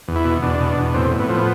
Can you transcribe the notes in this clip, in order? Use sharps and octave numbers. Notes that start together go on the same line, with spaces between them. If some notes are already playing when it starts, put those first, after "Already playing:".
E2
E4
B2
E2 D4
B2
E2
A2 C4
A2
B3
F3
B3